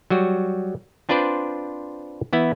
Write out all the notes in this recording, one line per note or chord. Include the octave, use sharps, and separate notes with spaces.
F#3 G3 F#4
C4 D4 F4 B4 C5 D5
E3 B3 E4